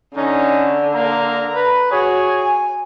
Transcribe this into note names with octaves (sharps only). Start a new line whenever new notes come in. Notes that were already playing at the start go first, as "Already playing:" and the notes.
D3 C#4 D#4
A#3 A#5
B4
F#4 G#4 C#5
G#5